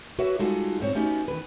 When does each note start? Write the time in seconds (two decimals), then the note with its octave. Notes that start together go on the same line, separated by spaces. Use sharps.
0.19 F#4 B4 C#5 E5 F#5
0.39 G3 G#3 D#4 F4 F#4 A4
0.80 G#2 C4 C#5
0.95 A3 B3 C#4 D#4 F#4 G4
1.28 E2 G2 D#3 B4